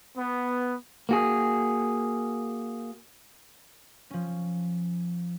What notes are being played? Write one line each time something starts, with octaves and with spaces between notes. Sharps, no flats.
B3
A#3 F#4 G#4
F3 C#4